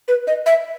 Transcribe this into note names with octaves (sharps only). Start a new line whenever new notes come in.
B4
D#5
E5